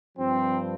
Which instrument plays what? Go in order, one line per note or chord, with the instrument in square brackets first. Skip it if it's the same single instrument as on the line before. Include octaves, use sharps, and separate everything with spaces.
[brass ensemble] G2 F3 C4